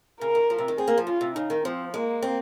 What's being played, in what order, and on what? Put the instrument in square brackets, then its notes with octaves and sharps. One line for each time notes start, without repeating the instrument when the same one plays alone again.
[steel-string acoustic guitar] C#3 [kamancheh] A#4
[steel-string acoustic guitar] D#3
F3
C3
D#3
[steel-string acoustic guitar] C4 [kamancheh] G#4
[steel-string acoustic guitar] A#3
F3
[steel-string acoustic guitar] C#3 [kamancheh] F4
[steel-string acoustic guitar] C3
[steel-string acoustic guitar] C#3 [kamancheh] D#4
[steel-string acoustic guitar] D#3
[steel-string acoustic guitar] F3 [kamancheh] C4
[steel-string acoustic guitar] G#3 [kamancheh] A#3
[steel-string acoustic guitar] C4